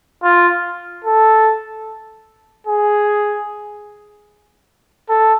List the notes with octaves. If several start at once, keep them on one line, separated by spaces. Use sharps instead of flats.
F4
A4
G#4
A4